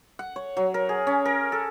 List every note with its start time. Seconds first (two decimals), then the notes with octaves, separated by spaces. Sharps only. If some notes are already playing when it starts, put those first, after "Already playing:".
0.19 F#5
0.36 C#5
0.57 F#3
0.74 A#4
0.89 G#4
1.07 C#4
1.25 A#4
1.52 A4